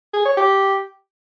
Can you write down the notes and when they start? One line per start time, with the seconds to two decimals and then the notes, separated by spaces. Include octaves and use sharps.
0.14 G#4
0.25 C#5
0.37 G4